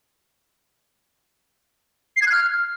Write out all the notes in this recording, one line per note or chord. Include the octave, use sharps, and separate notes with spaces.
C7
G#6
F#6
F6